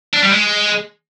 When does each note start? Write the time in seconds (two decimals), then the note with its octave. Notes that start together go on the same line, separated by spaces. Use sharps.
0.14 D4
0.23 G3
0.32 G#3